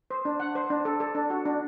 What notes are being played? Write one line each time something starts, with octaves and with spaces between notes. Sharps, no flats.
C5
D4
F#5
C5
D4
A4
A4
D4
F#4
D4